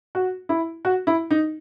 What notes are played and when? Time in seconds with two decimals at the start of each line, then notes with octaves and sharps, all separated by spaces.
0.15 F#4
0.49 E4
0.85 F#4
1.07 E4
1.31 D#4